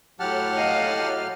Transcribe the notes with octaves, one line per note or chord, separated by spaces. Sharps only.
A2 F#3 G4 F#5 A5 F6
D#5 F5